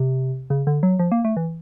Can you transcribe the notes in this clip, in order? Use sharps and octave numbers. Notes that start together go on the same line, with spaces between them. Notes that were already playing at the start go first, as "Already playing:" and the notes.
Already playing: C3
C#3
D3
F#3
F3
A#3
A3
E3